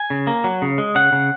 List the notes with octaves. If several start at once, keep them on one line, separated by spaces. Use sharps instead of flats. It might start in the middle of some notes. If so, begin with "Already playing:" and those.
Already playing: G#5
C#3
A#3
F#3
C#3
G#3
C#3 F#5
C#3